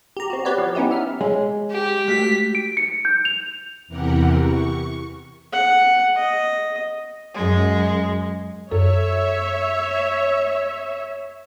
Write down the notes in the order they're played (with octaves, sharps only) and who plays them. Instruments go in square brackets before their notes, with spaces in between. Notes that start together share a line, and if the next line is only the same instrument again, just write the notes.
[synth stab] G4 A#5
C4 F#4
B3 G4 B4 C#5 D5
F3
B3 C#4 D#4 E4 G4
E5 F6
[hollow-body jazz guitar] G#3 [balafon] C#5
[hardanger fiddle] G4
[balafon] G#3 A3 F#4 [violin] B6
[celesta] D7
C#7
G6
F7
[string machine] E2 C3 E3 G4 A#4 F#5
C#6
[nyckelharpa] F#5
D#5
[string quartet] F#2 G#3
[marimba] F#2 A4 [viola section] C#5 E5